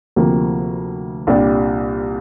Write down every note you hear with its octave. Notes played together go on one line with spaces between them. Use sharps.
D2 C3 F3 A#3
C2 A#2 G3 D4